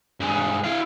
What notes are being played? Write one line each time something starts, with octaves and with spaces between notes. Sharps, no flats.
G2 G#3
E4 F5